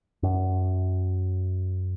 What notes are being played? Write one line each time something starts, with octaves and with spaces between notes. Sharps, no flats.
F#2